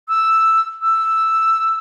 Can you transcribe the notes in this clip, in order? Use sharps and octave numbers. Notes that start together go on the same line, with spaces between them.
E6
E6